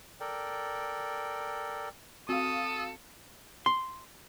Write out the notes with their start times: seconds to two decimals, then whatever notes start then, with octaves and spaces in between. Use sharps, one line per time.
0.20 A4 A#4 D5 G5
2.29 C4 F#4 A4 F5 D#6
3.66 C6